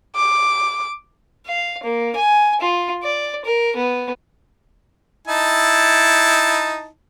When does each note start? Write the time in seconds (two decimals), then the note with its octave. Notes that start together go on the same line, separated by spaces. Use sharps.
0.16 D6
1.47 F5
1.83 A#3
2.16 G#5
2.61 F4
3.04 D5
3.45 A#4
3.76 B3
5.28 D#4 E4 A5